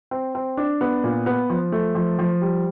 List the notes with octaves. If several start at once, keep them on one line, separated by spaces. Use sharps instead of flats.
C4
C4
D4
B3
A#2
B3
F3
A3
F3
F3
G3